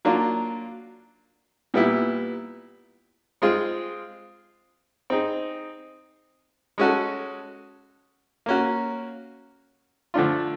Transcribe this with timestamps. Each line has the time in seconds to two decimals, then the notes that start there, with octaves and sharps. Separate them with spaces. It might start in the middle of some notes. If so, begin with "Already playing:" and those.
0.05 F#3 A#3 D4 F4
1.74 A#2 G3 B3 E4
3.42 G#3 C4 F4 G#4
5.10 C4 D#4 G#4
6.78 G#3 C#4 F#4 A4
8.46 A#3 C#4 F#4
10.14 D3 F3 A3 D4 F4